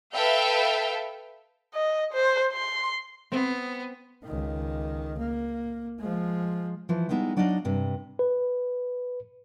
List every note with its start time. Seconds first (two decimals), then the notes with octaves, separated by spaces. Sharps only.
0.15 A4 B4 E5 F5 G5
1.74 D#5
2.13 C5
2.53 C6
3.32 B3 C4 C6
4.23 C#2 D#3
5.18 A#3
5.99 F3 G#3
6.89 E3 F3
7.09 G3 G#3 B3 D#4 E4
7.37 F#3 D4 D#4 D5 D#5 F5
7.65 G2 C3
8.19 B4